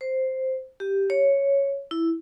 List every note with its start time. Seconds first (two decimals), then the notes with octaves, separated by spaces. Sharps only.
0.01 C5
0.80 G4
1.10 C#5
1.91 E4